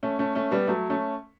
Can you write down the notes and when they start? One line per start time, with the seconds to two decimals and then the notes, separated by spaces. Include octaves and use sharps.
0.03 A3 C#4
0.19 A3 C#4
0.35 A3 C#4
0.51 G3 B3
0.67 F#3 A3
0.90 A3 C#4